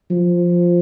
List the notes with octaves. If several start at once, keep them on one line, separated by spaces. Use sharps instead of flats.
F3